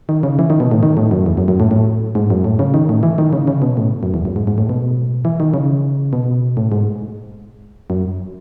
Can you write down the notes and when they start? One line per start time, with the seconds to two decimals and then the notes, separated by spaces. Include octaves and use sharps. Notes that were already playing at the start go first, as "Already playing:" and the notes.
0.09 D#3
0.23 C#3
0.39 E3
0.50 D#3
0.60 B2
0.71 A2
0.83 D#3
0.97 A2
1.11 F#2
1.26 E2
1.37 F#2
1.48 F#2
1.60 A2
1.71 A2
2.15 G#2
2.30 F#2
2.44 A2
2.59 C#3
2.74 D#3
2.89 A2
3.03 E3
3.18 D#3
3.33 C#3
3.48 C#3
3.62 B2
3.77 A2
4.03 F#2
4.14 E2
4.25 F#2
4.36 G#2
4.47 G#2
4.58 A2
4.69 B2
5.25 E3
5.40 D#3
5.54 C#3
6.13 B2
6.57 A2
6.72 G#2
7.90 F#2